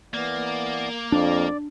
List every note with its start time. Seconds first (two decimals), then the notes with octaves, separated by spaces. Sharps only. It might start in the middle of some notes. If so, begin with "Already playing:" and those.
0.14 E3 A#3 B3 D5
1.12 F2 D4 D5